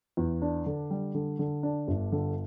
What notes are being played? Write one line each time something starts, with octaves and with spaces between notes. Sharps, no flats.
E2
D4
D3
G3
D3
D3
D4
G1
D3